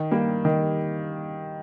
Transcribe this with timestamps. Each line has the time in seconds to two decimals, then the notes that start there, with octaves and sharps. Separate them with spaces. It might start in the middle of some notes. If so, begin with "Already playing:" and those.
Already playing: D#3
0.12 G3 A#3
0.45 D#3